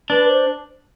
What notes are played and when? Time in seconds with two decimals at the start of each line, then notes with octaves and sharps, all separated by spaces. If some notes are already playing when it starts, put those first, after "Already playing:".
0.10 D4 B4
0.28 C5